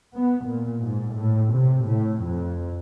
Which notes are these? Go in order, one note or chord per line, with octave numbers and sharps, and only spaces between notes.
B3
A#2
G#2
A2
C3
A2
F2